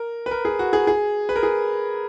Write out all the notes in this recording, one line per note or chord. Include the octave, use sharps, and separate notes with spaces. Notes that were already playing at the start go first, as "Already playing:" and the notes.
Already playing: A#4
B4
A#4
G#4
F#4
G#4
G#4
B4
A#4
G#4